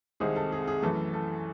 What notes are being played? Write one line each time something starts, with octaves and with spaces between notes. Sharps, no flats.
C2 C3 D#3 G#3 C4 G#4
A4
G#4
G#4
F#2 E3 A3 A4
A4